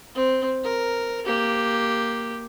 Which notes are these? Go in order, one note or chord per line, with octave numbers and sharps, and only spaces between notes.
C4
A#4
A#3 G4